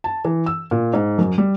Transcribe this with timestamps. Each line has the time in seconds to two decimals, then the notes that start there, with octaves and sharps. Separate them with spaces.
0.04 A5
0.25 E3
0.46 E6
0.71 A#2
0.93 G#2
1.18 F#2
1.38 G3